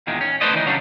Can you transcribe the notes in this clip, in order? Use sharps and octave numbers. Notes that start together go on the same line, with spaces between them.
E2 A#2 D#3 G#3
C#4
A3 C#4 B4 C5 D5 D#5
D#3 E3 D#4
C#3 F#3 G3 C#4 D4